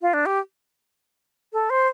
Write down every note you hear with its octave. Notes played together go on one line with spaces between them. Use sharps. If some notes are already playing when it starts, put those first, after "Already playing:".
F4
D4
G4
A4
C5